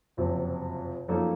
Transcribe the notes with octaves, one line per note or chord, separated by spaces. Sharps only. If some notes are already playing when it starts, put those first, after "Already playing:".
F#1 F2 C3 F#3 C4
F#2 F3 A#3 D#4 A4